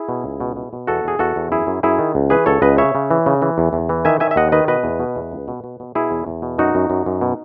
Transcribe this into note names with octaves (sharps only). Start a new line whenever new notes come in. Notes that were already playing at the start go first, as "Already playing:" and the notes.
Already playing: E4 G#4
B2
C#2
B2
B2
B2
E2 F#4 A4
E2 G#4
E2 F#4 A4
E2
F#2 E4 G#4
F#2
F#2 E4 G#4
D#3
C#2
E3 G#4 B4
C#2 A4 C#5
C#2 B4 D#5
C#3 C#5 E5
C#3
E3
C#3
E3
E2
E2
E3
D#3 E5 G#5
D#3 E5 G#5
E5
D#2 D#5 F#5
D#3 B4 D#5
B2 B4 D#5
E2
B2
E2
C#2
B2
B2
B2
B2 E4 G#4
E2
E2
B2
F#2 D#4 F#4
F#2
F#2
F#2
B2